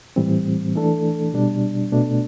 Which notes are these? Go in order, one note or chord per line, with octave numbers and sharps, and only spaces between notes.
A2 E3 G3 C4
E3 A3 D4 A4
B2 G3 D4
B2 A3 D4